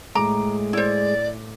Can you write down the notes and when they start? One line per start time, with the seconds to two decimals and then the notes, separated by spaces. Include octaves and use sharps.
0.15 A2 G#3 A#5 D6 D7
0.73 E4 C5 D5